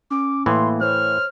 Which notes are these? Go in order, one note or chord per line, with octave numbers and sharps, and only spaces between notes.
C#4 D6
A2 E3 A#3 C6
C5 C#5 F6